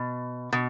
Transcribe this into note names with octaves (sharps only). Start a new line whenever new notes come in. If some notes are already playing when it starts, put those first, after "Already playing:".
Already playing: B2
B2